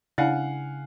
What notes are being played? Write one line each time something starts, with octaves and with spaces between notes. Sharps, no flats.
C#3 D4 E4 D5 F5 F#5 G#5